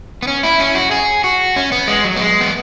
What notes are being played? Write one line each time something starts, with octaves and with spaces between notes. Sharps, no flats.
B3
C#4
E4
C#4
F#4
G#4
F#4
C#4
B3
G#3
F#3
B3
G#3
B3